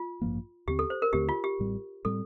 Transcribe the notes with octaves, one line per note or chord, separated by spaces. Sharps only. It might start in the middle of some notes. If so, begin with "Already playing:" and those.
Already playing: F4
A1 G2 F3 A#3
D#2 D3 A3 C4 G4
A4
C5
A#4
D#2 D3 A3 C4 G4
F4
G4
A1 A2 G3 C4
A2 G3 C4 A4